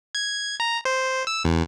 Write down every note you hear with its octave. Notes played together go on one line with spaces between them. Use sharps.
G#6
A#5
C5
E6
E2